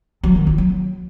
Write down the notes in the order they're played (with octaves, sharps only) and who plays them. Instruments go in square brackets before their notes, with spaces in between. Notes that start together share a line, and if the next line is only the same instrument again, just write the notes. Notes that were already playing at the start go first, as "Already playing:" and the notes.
[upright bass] F#3
D#3
F4
F#3